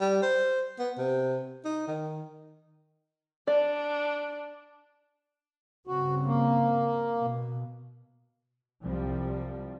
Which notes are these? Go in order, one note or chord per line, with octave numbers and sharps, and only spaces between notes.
G3
C5
B3
C3
D#4
D#3
D4 D5
G2 C#3 C4 F#4
A#3
B2
C2 F3 G3